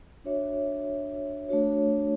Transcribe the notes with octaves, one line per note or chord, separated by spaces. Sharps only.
D4 F#4 C#5 E5
A3 D4 F#4 C#5